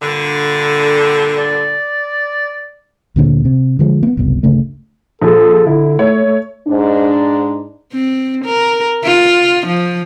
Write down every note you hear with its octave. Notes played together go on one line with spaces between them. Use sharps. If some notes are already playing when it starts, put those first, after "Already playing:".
G2 A#2 D3
D5
D2 A#2 D3
C3
D3 F3 G#3
A#3 B3
F#1 C2 B2
G1 D2 C#3 A3
A#1 G#4 A4
D3 E4
A3 C#5
A3
G#2 D4
C4
A#4
F4
F3